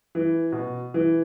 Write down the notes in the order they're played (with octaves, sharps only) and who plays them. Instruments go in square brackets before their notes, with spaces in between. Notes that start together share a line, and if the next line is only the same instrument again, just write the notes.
[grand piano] E3
B2
E3